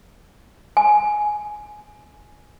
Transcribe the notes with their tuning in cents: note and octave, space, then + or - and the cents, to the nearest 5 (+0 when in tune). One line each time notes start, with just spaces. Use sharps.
G#5 +10